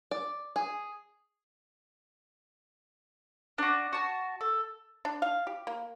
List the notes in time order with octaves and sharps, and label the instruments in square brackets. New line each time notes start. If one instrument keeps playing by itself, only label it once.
[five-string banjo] D5
G#4
[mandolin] D4 F#4
F#4 A5
A4
[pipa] D4
F5
G4
A#3